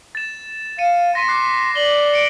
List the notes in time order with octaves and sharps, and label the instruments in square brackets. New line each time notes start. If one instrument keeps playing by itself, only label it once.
[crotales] A6 E7
[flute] F5 [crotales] C#7 D#7 E7
[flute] C6 [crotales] A#6 B6 D#7
[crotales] D6 F#6 C7
[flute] D5 [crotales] F#7 G7
[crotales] C#7 D7